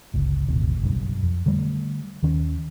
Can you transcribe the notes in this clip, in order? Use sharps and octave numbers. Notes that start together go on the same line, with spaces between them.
G1 C#2
D#1 G#1 D2 C3
F#1 B1 G2
F2
D3 G3 A3
D#2 D#3 C#4